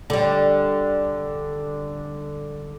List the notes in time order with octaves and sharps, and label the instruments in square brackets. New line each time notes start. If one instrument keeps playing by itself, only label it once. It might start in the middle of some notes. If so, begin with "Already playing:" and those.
[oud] D3 G3